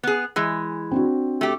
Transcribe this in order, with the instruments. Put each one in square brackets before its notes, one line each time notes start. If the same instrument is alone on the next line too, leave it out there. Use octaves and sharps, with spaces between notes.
[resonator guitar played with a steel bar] B3 G#4
E3 G#3
[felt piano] C4 D4 F#4
[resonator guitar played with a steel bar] A3 G4